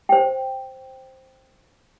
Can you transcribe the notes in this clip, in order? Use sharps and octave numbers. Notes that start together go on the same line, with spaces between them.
C5 G5